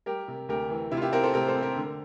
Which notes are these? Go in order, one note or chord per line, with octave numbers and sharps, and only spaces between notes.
G3 G4 A#4
C3
D2 G4 A#4
E3
C3 E4
F4
E4 G4
C4 G4 A#4
A4 C5
C3 G4 A#4
A4 C5
C4
G4 A#4
D3